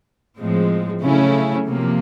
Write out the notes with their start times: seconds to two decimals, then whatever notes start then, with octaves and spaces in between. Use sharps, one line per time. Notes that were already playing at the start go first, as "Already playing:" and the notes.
0.37 A2 F3 G#3 C4
1.02 C#3 F#3 A3 C#4 E4
1.67 C3 F3 A#3